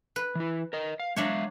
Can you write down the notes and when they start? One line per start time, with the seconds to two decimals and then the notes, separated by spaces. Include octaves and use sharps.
0.16 B4
0.35 E3 E4
0.73 A#4 D#5
1.00 F5
1.16 F#3 G#3 D4 C#5 E5 F5